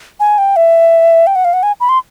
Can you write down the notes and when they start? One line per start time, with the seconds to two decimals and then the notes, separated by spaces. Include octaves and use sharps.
0.20 G#5
0.38 G5
0.56 E5
1.27 G5
1.36 F#5
1.45 F5
1.53 F#5
1.63 G#5
1.80 B5
1.89 C6